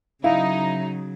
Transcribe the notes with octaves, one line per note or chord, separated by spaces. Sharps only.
C#3 F#3 D#4 E4 F5